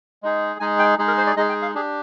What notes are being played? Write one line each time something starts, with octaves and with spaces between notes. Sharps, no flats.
G#3 D#4 G#4
G#3 D#4 G#4 G#5
G5
G#3 D#4 G#4
A#4
C5
D5
G#3 D#4 G#4 D#5
G5
F5
D4 G4 G#4